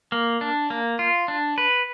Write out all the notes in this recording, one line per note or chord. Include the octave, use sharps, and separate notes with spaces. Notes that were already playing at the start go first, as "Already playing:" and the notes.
A#3
D4
A#3
F4
D4
B4